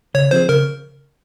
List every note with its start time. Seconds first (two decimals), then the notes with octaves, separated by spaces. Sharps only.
0.14 C#3 C#5
0.31 F3 C4 F4 G#4 C5
0.49 C#3 A#4